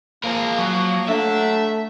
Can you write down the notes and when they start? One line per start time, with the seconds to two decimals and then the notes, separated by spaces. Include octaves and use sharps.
0.24 F3 A#3 G#4 A#4
0.58 F#3
1.09 F#3 A3 D4 E5